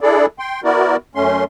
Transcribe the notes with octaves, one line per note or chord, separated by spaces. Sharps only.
D4 E4 G#4 A4 D5
G5 C6
B3 E4 F#4 A#4 D5
F#2 A3 C#4 C6